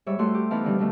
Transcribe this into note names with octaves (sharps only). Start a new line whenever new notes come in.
G#2 G3 C#5 E5
G3 A3 F#4 C6
G4
E3 B3 D#4 E4 F5 A5
B2 D3 D#3 G3
B2 D#3 A3